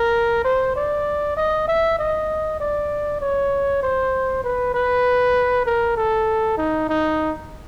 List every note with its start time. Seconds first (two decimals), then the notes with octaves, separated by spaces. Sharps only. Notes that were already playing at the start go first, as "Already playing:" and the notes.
Already playing: A#4
0.45 C5
0.76 D5
1.37 D#5
1.68 E5
1.99 D#5
2.60 D5
3.21 C#5
3.83 C5
4.44 B4
4.74 B4
5.66 A#4
5.96 A4
6.57 D#4
6.89 D#4